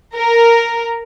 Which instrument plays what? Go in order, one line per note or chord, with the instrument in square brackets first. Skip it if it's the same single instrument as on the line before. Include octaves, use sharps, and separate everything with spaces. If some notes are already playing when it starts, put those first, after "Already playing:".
[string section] A#4